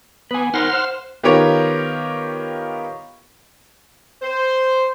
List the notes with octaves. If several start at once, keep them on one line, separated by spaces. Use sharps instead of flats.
B3 B4 G#5
D#4 A#4 C5 F#5 C6 F6
C5
D#3 B3 F4 G4 A#4 C#5
C5